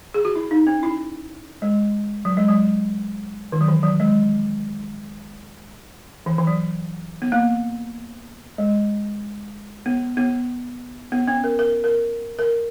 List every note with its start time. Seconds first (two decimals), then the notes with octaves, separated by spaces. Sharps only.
0.14 G#4
0.25 F#4
0.35 E4
0.51 D#4
0.67 C#4
0.83 E4
1.62 G#3
2.25 F#3
2.37 G#3
2.49 F#3
3.52 D#3
3.61 F#3
3.68 E3
3.83 F#3
4.00 G#3
6.26 E3
6.38 E3
6.47 F#3
7.22 B3
7.32 A#3
8.58 G#3
9.86 B3
10.17 B3
11.12 B3
11.28 C#4
11.44 A#4
11.59 A#4
11.84 A#4
12.39 A#4